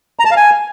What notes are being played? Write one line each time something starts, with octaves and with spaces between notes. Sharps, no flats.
A#5
A5
F5
G#5